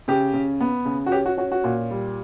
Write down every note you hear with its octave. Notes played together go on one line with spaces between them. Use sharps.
C#3 G4
C#3
B3
C#3
F#4
C#4 G4
F#4
C#4 F#4
F#4
A#2
G3